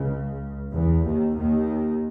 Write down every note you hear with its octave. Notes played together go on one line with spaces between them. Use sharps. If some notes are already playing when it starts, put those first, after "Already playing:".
Already playing: C#2 C#3
E2 E3
D#2 D#3
D#2 D#3